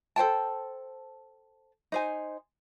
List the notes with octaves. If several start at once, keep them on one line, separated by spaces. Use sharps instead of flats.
A4 C5 G5 A5
D#4 C5 G#5